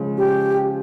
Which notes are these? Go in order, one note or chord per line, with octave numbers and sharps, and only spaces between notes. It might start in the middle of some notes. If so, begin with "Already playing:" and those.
Already playing: C#3 F3 G#3
C#4 G4